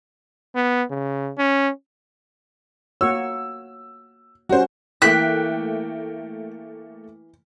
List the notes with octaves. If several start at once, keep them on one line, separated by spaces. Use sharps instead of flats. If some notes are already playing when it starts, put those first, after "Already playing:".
B3
C#3
C#4
A#3 F#4 C#5 E6
G3 C#4 F#4 C5
E3 A3 A#3 G5 F#6 B6